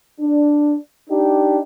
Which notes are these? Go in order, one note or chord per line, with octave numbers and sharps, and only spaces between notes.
D4
D4 D#4 G4